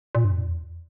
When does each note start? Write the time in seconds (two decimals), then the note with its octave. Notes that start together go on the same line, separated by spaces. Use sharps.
0.15 A#2
0.25 G2
0.31 F2
0.48 E2